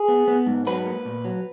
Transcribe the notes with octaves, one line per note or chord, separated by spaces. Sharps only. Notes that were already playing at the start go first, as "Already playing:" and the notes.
Already playing: G#4
B3
B3
G#2
F#3 B4
A#3
A#2
F#3